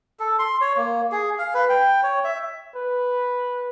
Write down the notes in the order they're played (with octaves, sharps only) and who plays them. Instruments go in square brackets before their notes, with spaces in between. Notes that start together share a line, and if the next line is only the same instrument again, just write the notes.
[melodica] A4
C6
C#5
A#3
G#4
F5
B4
G5
C#5
E5
[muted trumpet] B4